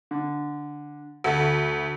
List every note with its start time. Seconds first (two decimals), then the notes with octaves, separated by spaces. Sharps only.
0.11 D3
1.24 D2 F#4 A4